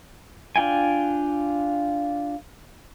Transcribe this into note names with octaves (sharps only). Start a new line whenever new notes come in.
D4 F4 G5 G#5